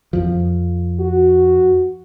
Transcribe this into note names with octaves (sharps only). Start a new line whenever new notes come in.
F2 F3
F#4